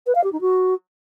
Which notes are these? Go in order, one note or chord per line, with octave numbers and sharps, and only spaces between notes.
B4
F5
G4
D#4
F#4